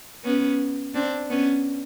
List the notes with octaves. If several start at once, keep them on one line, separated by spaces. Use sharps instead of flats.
B3 C#4
C4 D4
B3 C#4